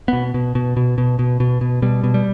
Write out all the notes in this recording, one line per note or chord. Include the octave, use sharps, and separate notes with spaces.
B2 B3
B2
B2
B2
B2
B2
B2
B2
B2 G3
B2
G3